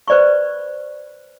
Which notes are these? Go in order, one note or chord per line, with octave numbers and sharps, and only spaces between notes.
B4 C5 D5 B5 C#6